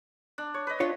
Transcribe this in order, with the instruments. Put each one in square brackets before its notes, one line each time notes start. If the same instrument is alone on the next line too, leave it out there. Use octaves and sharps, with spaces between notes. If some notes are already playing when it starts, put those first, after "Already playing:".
[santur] D4
C#5
B4 D#5
[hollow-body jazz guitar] D4 F4 C#5